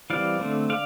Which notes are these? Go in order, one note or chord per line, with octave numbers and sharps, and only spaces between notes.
E3 G3 C4 D5 F5
D3 A3 C4
D3 D5 F5